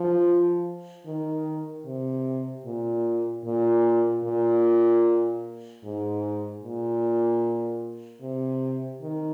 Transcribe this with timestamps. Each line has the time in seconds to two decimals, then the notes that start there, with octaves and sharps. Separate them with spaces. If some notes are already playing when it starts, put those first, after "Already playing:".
Already playing: F3
1.06 D#3
1.86 C3
2.65 A#2
3.45 A#2
4.25 A#2
5.84 G#2
6.63 A#2
8.22 C3
9.02 D#3